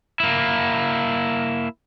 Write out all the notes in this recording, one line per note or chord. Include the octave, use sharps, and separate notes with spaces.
A#3 E4